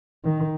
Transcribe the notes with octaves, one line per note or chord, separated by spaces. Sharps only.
D#3